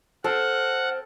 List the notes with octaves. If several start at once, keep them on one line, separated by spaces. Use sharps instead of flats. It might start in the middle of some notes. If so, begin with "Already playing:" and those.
C4 A4 F#5 F6